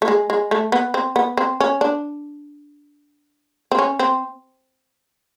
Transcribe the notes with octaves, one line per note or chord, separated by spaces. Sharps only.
A3
G#3
G#3
A3
B3
C4
B3
C4
C#4
D4
C4
C#4
C4